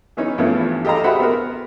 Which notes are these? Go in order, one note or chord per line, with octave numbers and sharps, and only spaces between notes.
E3 B3 C#4 D#4
E2 G2 F3 A3 B3 C#4
G4 A4 D#5 F5 A#5
F#4 G#4 C5 E5 F#5 B5
B3 A#4